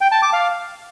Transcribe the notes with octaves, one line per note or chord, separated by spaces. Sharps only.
G5
A5
D6
F5